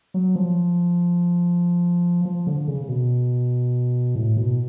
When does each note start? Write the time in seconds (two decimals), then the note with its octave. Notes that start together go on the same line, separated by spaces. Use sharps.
0.14 F#3
0.36 F3
2.25 F3
2.47 D3
2.68 C#3
2.84 C#3
2.89 B2
4.15 A2
4.37 B2